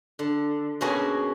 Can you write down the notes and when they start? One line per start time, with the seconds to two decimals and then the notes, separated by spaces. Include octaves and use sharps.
0.19 D3
0.81 B2 A#3 C#4 F#4 G#4